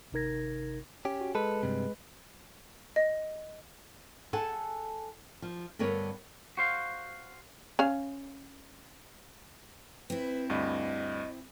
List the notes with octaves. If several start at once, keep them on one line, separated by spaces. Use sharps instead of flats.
G#1 C3 D#4 A#4 G#6 A#6
C#4 G4
F#4
G#3 A4 B4
G2 C3
D#5
G#4 A4 F#5 G#5 A5
F3
G2 D3 B3 A#4 C#5
F#4 C5 F5
C#4 F5
C4 E4 B4
D2 G2 D#5